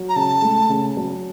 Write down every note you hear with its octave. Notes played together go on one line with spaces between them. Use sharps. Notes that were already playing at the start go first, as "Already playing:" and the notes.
Already playing: F#3
A#5
C#3 A5
A3
C#3
F#3